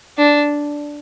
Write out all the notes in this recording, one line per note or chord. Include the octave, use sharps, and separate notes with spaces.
D4